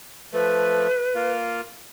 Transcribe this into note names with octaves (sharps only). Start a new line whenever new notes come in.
F3 A3 B4
A#3 F4